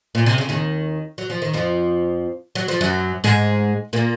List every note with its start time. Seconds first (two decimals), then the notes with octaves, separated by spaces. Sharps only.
0.15 A#2
0.26 C3
0.38 C#3
0.49 D#2 D#3
1.18 F#3
1.30 F3
1.42 D#3
1.53 F2 F3
2.55 F#3
2.68 F3
2.81 F#2 F#3
3.24 G#2 G#3
3.93 A#2 A#3